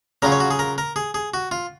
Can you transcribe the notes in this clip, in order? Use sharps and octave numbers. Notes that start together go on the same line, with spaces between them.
C#3 F#3 C#4 F4 A#4
C#5
F#4
G#4
A#4
A#4
G#4
G#4
F#4
F4